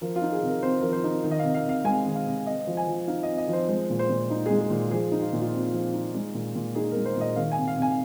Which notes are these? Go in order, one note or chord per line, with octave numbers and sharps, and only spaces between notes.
F3 A#4
F4
D#4
G#4
C3
A#4
C4 C5
F3 A#4
C5
D#4
D#3
D#5
C3 F5
F5
C3 F5
G#3 G#5
D#3
F5
C3
C4 D#5
F3
G#5
F3
D#4 F5
C4 D#5
D#5
F3
C5
G#3 C5
A#2
C5
A#2
D#4
G#3 G#4
G#4
A#2
F3 G#4
D#4
F4
A#2
F4
C4
F3
D#4
G#3
A#2
A#2
D#4 G#4
A#4
G#3
C5
A#2 D#5
D#3 F5
G#5
C3
F5
C3 G#5